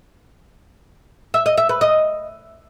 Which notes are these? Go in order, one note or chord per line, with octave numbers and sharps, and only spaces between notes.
E5
D#5
E5
B4
D#5